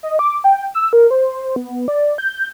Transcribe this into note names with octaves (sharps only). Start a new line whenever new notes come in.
D#5
D6
G5
E6
A#4
C5
B3
D5
G6